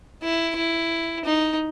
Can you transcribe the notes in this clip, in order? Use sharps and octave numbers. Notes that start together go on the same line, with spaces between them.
E4
E4
D#4